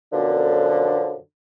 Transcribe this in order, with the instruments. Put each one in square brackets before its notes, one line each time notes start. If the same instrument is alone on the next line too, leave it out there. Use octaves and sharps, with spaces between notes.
[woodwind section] F#2 B2 D3 F3